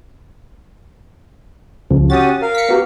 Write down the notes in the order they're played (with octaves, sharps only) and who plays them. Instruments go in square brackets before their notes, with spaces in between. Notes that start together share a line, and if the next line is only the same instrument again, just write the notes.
[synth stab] C#2 C#3 F3
[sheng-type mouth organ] C#4 F#4 G4 [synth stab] D#6 A6
[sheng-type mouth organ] A#4 F5
[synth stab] B6 C#7
B3 F#4 G4